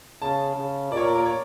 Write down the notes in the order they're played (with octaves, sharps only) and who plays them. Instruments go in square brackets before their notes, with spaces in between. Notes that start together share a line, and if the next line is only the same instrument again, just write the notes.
[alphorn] C#3 [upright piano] A5
[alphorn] C#3
[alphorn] A#2 [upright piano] D5
[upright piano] C#5
A#4
A#4
C#5